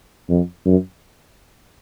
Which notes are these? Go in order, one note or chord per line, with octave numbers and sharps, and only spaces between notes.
F2
F#2